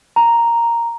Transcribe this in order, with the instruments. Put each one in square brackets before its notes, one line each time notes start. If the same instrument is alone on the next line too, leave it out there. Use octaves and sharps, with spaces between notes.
[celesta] A#5